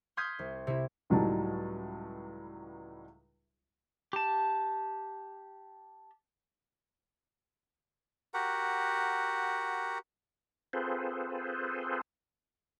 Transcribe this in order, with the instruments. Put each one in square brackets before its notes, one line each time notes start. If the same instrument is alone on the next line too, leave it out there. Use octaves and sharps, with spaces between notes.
[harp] C6 D#6 F6 G6 G#6 B6
C2
C3 E4
[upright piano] C#2 A2 F#3 G3 D#4 A5
[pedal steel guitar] G4 A5
[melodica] F#4 G4 A#4 F#5
[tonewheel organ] C4 F4 G#4 A4 B4 C5